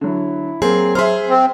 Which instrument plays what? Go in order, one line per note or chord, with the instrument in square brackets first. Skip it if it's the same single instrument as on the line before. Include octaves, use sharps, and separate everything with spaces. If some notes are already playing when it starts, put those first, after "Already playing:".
[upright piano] D3 F#3 [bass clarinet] E4
[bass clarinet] F#3 [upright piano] A#3 C4 [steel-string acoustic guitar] G#4
[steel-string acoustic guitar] G#4 C5 [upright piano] E5 C6 F6
[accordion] C4